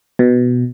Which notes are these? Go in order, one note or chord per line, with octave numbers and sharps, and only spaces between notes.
B2